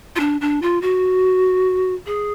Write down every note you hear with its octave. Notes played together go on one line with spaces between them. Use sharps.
F4
D4
D4
F4
F#4
G#4